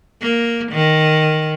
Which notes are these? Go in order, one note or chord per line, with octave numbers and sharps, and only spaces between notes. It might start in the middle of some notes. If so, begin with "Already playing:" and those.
A#3
D#3